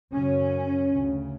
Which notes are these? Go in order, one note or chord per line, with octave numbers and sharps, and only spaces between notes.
F#2 C#3 C#4
D2 C#3